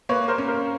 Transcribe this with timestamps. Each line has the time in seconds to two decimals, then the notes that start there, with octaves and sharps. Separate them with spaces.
0.09 A#3 B4 C#5
0.28 A#4 C5
0.38 C#4
0.48 A#4 C5